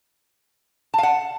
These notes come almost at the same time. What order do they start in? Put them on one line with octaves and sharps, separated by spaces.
A5 F5 F#5